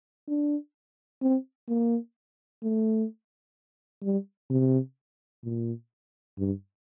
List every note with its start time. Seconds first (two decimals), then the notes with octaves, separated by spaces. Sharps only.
0.28 D4
1.22 C4
1.68 A#3
2.63 A3
4.03 G3
4.50 C3
5.44 A#2
6.38 G2